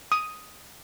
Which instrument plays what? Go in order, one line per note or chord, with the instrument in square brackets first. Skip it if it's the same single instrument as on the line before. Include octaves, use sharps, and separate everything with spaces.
[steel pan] D#6